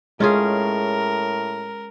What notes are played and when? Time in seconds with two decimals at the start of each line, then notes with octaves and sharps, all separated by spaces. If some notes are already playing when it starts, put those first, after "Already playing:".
0.20 A2 G#3 C#4 F4 G#4 A#4